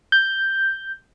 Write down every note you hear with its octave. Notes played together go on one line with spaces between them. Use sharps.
G6